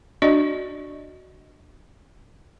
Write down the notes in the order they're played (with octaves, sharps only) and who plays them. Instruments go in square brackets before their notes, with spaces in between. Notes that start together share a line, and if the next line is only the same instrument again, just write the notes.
[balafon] D4 F#4 D5 D#5